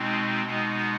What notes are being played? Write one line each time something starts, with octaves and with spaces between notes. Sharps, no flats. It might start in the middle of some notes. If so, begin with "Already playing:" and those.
Already playing: B2 G#3 C4 D#4
B2 G#3 B3 D#4